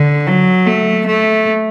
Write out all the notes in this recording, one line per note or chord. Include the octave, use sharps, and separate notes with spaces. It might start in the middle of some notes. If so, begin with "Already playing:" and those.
Already playing: D3
F#3
A3
A3